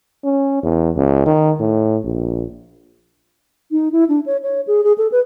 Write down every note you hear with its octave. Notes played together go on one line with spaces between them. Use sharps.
C#4
E2
C#2
D#3
A2
A#1
D#4
E4
D4
C#5
C#5
G#4
G#4
A4
B4